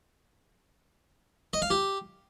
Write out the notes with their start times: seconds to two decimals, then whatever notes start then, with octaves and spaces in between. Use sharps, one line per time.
1.53 D#5
1.62 F5
1.70 G4